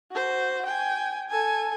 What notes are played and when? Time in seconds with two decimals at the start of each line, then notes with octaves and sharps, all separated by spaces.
0.12 F#4 C5
0.66 G5 G#5
1.29 A4 G#5